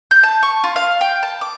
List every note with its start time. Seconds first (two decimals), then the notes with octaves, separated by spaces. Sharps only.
0.11 G6
0.23 A5
0.43 C#6
0.64 F4
0.76 F5
1.01 G5
1.23 A5
1.41 D6